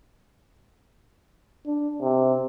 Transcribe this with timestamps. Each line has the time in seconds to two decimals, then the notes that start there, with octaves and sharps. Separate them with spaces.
1.66 D4
2.01 C3